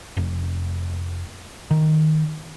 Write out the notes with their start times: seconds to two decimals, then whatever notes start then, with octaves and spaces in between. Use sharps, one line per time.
0.17 F1
1.71 D#3